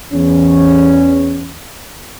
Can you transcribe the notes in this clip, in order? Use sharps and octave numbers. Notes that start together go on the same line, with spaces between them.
E2 C#4